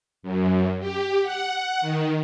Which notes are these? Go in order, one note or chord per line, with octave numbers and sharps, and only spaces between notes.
F#2
G4
F#5
D#3